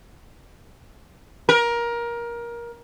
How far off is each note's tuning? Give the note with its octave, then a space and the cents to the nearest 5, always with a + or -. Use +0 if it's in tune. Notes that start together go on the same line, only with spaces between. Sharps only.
A#4 +20